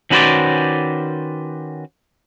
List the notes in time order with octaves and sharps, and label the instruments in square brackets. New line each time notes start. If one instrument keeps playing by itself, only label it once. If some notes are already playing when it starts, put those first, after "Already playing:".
[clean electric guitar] D#3 C#4 F#4 B4 C5 D5